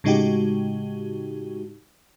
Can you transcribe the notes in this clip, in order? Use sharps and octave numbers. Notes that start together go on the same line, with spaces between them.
A2 C#3 G#3 D#4 F#4 G4